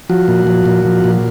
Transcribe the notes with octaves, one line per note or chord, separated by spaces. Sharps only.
F3 F#4
A#2
F3
A#2
F3
A#2